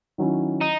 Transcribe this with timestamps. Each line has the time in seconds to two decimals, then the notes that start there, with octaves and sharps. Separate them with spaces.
0.18 D#3 F#3 C#4 E4
0.61 D#4